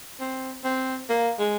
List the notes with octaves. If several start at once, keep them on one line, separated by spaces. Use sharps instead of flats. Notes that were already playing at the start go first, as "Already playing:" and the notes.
C4
C4
A#3
G#3